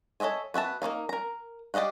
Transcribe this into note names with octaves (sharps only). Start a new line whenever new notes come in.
A4 C#5 D#5 E5 G#5
B3 F#4 E5 A5
A#3 C#4 D#4 F5
A#4 A#5
G4 D5 D#5 F5 F#5